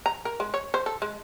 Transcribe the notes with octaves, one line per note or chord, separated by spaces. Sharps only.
A#5
A#4
G#3
C#5
C5
A4
G#3